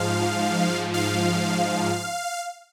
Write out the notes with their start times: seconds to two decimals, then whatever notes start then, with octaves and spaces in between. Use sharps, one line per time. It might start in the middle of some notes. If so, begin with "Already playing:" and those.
Already playing: G#2 F3 F5
0.94 F5